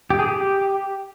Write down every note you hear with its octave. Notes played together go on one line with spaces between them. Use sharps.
G4
G#4
G4